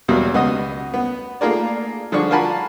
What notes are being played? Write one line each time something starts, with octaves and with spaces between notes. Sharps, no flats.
E2 B2 F#3 G3 A#3
C#2 B3 F#4 D#5 D#6
B3
A3 A#3 F4 G#4 A#4 D5
D3 F3 G#4 D5 C#6
F4 F#4 A#4 G#5 A5 B5